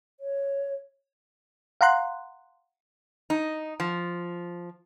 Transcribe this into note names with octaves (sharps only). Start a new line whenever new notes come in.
C#5
F5 F#5 A#5 C6 F#6
D#4
F3